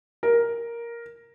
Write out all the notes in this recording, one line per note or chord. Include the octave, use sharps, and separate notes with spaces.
A#4